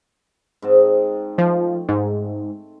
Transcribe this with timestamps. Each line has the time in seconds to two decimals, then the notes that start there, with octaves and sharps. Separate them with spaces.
0.62 G#2 C4 A5
1.38 F3 A3
1.89 G#2